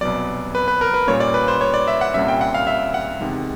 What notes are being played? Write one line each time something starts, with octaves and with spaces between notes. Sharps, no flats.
C2 B2 F#3 B3 D5
B4
B4
A#4
B4
A#2 G3 A#3 C#4 C#5
D5
B4
C5
C#5
D5
E5
F#5
C2 A#2 G3 A#3 C#4 E5
G5
F#5
F5
E5
F#5
E2 C3 D#3 G#3